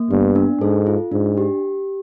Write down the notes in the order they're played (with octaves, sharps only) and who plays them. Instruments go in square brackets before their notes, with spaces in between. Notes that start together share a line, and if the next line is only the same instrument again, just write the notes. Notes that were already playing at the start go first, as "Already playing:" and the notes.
Already playing: [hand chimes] A#3
[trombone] G2 [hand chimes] B3
[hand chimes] D4
[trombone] G#2 [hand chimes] A4
[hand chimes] F4
[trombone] G#2 [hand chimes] D4
[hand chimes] G4